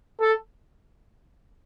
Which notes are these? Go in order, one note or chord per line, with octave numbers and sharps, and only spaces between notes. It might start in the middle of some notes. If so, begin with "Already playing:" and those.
A4